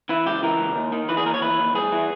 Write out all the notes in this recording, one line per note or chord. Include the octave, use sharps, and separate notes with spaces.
E3 E4
C#2 G4
E3 A#4
C#2
D#2
D#3
E3 B4
G#4
D#2 A#4
C#5
E3 B4
D#2
G2 G#4
E3